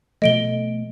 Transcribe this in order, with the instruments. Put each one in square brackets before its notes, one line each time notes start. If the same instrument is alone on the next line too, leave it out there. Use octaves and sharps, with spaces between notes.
[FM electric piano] B2 F3 A3 [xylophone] D#5 D7 G7